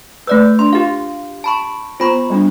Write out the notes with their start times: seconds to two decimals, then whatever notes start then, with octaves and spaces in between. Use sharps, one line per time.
0.27 A3 B4 D5 E6
0.59 D4 C6
0.73 F4 G4 F5
1.44 A5 B5 C#6
2.00 B3 F4 C5 B5 C#6
2.30 G3 B3 D4